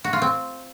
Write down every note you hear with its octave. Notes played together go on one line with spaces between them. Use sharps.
F#4
F4
C4